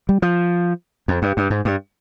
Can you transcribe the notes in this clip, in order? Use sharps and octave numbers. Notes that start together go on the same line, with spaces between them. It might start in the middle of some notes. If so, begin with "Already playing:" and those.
G3
F3
F2
G2
G2
G#2
G2